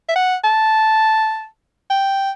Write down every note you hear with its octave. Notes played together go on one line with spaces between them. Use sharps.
E5
F#5
A5
G5